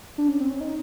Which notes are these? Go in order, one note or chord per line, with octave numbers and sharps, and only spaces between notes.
D4
C#4
C4
C#4
D#4